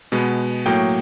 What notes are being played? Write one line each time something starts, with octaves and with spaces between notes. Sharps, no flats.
B2 G#3 B3
A2 F#3 A#3 G5